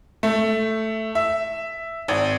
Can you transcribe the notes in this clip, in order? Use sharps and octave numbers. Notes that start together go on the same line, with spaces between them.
A3
E5
G#1